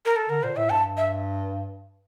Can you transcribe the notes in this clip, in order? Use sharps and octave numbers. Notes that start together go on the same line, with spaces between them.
A#4
A4
D3 A#4
A#2 C5
A2 E5
G2 A5
E5